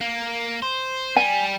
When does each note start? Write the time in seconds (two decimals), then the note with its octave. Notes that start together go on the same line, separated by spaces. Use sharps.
0.01 A#3
0.63 C5
1.16 G3 G#5